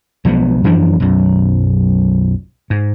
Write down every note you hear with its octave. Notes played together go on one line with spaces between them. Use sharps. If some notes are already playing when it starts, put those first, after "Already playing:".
B1 F3 G#3 B3
F#2 E3 F3 D4
B1 F#2
G#2